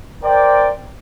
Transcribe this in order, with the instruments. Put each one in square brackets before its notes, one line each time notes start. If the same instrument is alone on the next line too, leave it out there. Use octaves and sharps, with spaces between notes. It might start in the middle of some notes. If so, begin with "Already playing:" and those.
[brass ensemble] A#4 C5 D5 G5